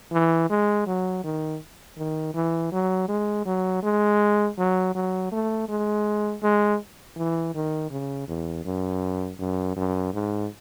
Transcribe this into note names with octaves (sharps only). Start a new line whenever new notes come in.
E3
G#3
F#3
D#3
D#3
E3
F#3
G#3
F#3
G#3
F#3
F#3
A3
G#3
G#3
E3
D#3
C#3
E2
F#2
F#2
F#2
G#2